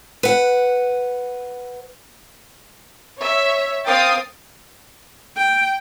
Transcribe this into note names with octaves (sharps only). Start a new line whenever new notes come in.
B4 F#5
C#5 E5
C4 A#4 F5 G5 D#6 A6
G5